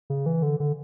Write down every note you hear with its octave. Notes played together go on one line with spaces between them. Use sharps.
C#3
E3
D3
D3